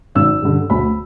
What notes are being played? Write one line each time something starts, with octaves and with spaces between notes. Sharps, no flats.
G#1 E6
G2 D3
D2 B5